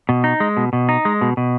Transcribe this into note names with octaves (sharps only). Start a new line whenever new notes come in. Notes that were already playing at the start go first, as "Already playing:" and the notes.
B2
D#4
G#3
B2
B2
D#4
G#3
B2
B2